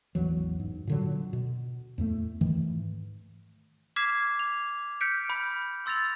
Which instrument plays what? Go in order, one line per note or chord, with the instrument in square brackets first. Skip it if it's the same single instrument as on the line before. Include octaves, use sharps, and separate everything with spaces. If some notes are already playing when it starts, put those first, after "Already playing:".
[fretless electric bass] A1 E2 E3 F#3
G#2
A#2 D3 F#3
B2
E2 A2 A3
G#2 D#3 E3 A3
[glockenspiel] D6 F6 G#6 B6 C7 E7
F7
F6 G6 B6 C#7 D7
B5 F6 G6
C6 E6 A6 A#6 F7